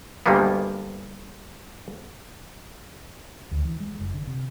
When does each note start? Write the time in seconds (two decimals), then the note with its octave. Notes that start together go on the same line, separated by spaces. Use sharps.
0.26 D2 G2 G3 G#3 A#3 B3
3.51 D2
3.65 E3
3.80 G#3
3.99 F#1
4.14 D3
4.27 C3